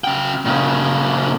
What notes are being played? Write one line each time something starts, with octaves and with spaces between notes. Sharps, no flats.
C#3 G5
A#2 C#3